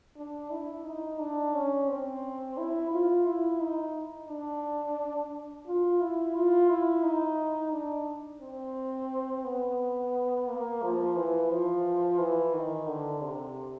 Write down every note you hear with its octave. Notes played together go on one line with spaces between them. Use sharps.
D4
E4
D#4
D4
C#4
C4
E4
F4
E4
D#4
D4
F4
E4
F4
E4
D#4
D4
C4
B3
A#3
F3
E3
F3
E3
D#3
D3
C3